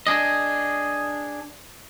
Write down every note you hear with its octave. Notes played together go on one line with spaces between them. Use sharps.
D4 G#4 D#5